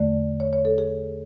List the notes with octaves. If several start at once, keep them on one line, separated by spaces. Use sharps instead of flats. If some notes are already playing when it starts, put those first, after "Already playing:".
Already playing: E2 D3 A3 D5
C#5
C#5
A4
G#4